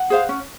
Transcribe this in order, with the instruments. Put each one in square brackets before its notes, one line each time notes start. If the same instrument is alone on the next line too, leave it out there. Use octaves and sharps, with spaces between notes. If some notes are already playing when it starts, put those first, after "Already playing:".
Already playing: [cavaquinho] F#5
[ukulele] G#4 C5 F5
C#4